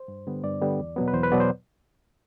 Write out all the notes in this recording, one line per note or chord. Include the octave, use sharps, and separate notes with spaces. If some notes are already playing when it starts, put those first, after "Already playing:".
Already playing: C5
G2
D3 G3 B3
G2 D5
D3 G3 B3
E2
B2 F#3 B3
B4
E2 C5
B4
B2 F#3 B3 D5
C5